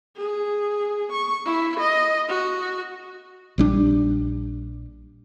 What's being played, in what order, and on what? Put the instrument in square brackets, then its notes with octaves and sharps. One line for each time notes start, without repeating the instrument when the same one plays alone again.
[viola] G#4
C#6
E4
D#5
F#4
[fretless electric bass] A#1 G3 D4